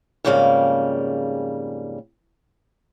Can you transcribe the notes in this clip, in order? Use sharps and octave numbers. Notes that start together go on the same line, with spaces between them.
F2 G#2 C#3 G3 A#3 F5